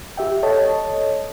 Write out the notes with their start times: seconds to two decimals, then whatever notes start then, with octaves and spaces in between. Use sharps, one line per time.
0.17 G4 E5 G5
0.43 A4 C#5 D#5 A5